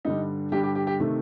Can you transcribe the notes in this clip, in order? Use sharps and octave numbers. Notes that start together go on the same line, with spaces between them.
G2 D3 G3 D#4
G2 D3 G3 G4
G4
G4
G4
C3 D#3 A3